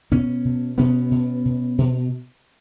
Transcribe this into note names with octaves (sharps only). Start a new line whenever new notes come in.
B2 B3 C#4
B2
B2 B3 C#4
B2
B2
B2